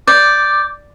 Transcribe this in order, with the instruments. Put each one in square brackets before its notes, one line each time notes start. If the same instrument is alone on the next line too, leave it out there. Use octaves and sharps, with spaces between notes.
[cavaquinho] D5 [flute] D6 [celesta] G6